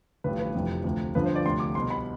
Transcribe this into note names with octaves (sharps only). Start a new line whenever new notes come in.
A1 G2 D3 F3 B4
B4
F1 F2 C3 E3
D2 C3 F3
G1 G2 D3 F3 B4
C5
D5
D2 C3 F3 C6
D6
C2 B2 C6
B5